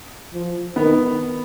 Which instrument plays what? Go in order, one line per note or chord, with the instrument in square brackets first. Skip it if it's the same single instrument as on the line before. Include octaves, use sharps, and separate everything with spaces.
[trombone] F3
[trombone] D#3 [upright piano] B3